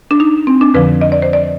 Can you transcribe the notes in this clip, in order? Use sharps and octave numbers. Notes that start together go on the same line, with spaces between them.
D4
D#4
C4
D4
F2 D3 F3 B4
D#5
D5
C5
D5